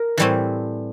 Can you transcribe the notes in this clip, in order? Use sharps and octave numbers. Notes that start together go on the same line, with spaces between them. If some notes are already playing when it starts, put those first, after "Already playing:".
Already playing: A#4
A2 E3 G3 C4